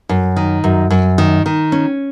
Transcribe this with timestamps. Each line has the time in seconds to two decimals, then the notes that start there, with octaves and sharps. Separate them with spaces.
0.09 F#2
0.36 D#3
0.64 F#2
0.90 F#2
1.18 D#3
1.46 D#3
1.72 C#4